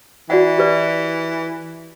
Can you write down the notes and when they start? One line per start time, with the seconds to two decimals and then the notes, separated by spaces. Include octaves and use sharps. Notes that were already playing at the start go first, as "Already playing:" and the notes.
0.30 E3 F#4 D5 F#5
0.58 G4 B4 D5